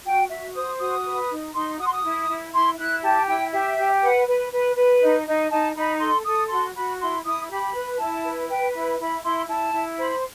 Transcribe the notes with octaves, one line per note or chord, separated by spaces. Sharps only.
F#4 G5
F#4 E5
C5 D#6
F#4 D#6
B4
D#4
D#4 C6
F#4 D#6
C6
D#6
E4
E4
E4 C6
E4 F#6
G4 A5
E4 G5
G4 E5
G4
B4 F#5
B4
B4
B4
D#4
D#4
D#4 A5
D#4 B5
A4 C6
A4 D#6
F#4 C6
F#4 B5
E4 C6
E4 D#6
G4 B5
B4
E4 A5
B4
B4 G5
E4 B5
E4 B5
E4 C6
E4 A5
E4
C5 B5